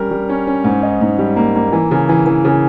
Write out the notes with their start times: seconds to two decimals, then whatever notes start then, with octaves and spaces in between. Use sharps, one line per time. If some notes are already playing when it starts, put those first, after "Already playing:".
Already playing: G3 C#4 A#4
0.11 G3
0.29 C#4
0.47 C#4
0.64 G#2
0.83 D#4
1.01 G#2
1.18 G3
1.36 A#3
1.55 A#3
1.72 E3
1.91 C#3
2.09 E3
2.26 E3
2.45 C#3